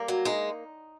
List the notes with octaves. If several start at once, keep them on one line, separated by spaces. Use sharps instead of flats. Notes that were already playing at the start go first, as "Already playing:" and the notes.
Already playing: G3 A#3
F#3
G#3 D#4